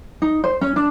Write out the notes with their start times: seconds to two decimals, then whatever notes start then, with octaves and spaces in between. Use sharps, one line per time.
0.22 D#4
0.44 C5
0.61 C#4
0.76 D4